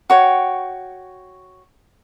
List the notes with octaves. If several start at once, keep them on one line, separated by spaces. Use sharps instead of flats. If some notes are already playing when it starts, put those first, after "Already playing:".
F#4 C#5 G5